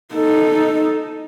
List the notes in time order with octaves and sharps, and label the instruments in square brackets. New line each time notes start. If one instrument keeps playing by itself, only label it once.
[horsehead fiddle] D#4 A4